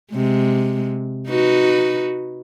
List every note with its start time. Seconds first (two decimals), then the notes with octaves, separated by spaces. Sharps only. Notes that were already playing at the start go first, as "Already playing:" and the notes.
0.13 C3 G#3
1.28 D#4 F#4 B4